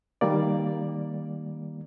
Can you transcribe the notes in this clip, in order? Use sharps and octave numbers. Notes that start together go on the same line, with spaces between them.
D#3 G3 A#3 D5